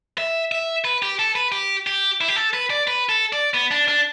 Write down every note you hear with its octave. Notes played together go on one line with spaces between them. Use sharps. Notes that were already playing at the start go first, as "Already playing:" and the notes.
E5
E5
B4
G4
A4
B4
G4
G4
E4
G4
A4
B4
D5
B4
A4
D5
B3
D4
D4